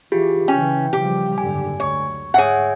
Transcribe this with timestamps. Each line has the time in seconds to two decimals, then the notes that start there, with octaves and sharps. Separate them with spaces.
0.12 E3 F4 G4 G#4
0.48 C#3 E3 C#4 G5
0.93 C#3 F3 G3 G4
1.38 F#1 G#2 D3 G#5
1.80 D2 C#5
2.34 G#2 G#4 C#5 E5 F#5 G#5